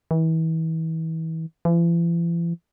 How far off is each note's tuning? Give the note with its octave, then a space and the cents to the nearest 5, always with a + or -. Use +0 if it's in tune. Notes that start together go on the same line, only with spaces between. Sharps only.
E3 -35
E3 +45